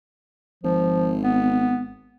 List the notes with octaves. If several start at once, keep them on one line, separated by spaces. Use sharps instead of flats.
G#1 F3
B3